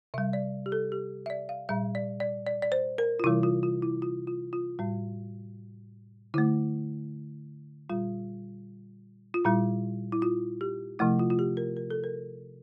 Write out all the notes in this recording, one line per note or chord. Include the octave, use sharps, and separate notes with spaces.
C3 G3 E5
D5
G4
A4
G4
E5
D5
F5
A#2 G3 E5
D5
D5
D5
D5
C5
A#4
F4
C3 E3 G3 E4
F4
F4
E4
F4
F4
F4
A2 G3
D3 A3 E4
A#2 G3 F4
F4
A#2 G3 E4
E4
F4
G4
C3 F3 A3 E4
F4
F4
G4
A#4
A#4
A4
A#4